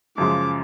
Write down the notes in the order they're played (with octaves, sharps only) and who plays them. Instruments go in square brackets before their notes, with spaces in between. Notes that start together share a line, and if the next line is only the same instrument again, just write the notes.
[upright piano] F#2 C#3 F3 G#3 [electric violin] D6